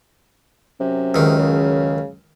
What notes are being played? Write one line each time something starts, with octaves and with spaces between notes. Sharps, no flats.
F#2 C3
C#2 D#3
C#3